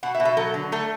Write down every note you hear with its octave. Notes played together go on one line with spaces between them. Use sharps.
B2 F#5
E5
B2
E5
F#3 A4
D3
A3 A4